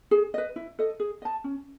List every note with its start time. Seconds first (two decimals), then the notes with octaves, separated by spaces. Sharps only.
0.11 G#4
0.34 B4 D#5
0.56 E4
0.79 A4 D#5
1.00 G#4
1.22 D#5 A5
1.44 C#4